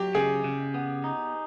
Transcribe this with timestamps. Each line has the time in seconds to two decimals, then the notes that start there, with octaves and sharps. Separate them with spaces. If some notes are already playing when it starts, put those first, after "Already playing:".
Already playing: F#3 G4
0.14 C#3 G#4
0.44 C#3
0.74 B3
1.04 D#4